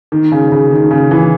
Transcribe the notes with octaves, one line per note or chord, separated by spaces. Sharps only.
D#3
C#3
C#3
D#3
C#3
E3